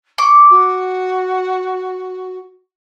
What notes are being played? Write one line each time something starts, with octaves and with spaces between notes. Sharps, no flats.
C#6 D6
F#4